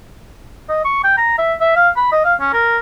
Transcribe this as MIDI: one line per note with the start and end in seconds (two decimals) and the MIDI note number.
0.69 0.84 75
0.85 1.02 85
1.04 1.14 79
1.18 1.34 82
1.38 1.54 76
1.61 1.73 76
1.76 1.89 77
1.97 2.08 83
2.12 2.23 75
2.25 2.34 77
2.40 2.50 61
2.53 2.78 70